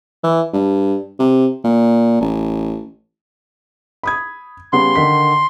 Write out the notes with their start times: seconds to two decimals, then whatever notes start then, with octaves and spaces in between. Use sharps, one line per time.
0.24 E3
0.53 G2
1.20 C3
1.64 A#2
2.21 A1
4.03 B5 D#6 G#6
4.73 C#3 G3 B3 C6
4.96 D3 D#3 B6